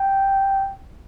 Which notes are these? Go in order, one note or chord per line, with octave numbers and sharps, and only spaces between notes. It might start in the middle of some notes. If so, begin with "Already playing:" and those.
Already playing: G5